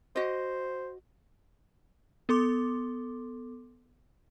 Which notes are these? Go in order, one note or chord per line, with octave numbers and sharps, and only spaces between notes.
F#4 C5 D#5
B3 A4 C6 D6